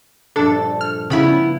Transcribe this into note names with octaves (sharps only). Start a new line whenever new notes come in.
A#1 G2 D4 A4
F6
C#3 B3 E4 F4 A5 B5